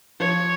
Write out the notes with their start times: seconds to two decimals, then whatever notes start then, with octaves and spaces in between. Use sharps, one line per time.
0.20 F3 C#5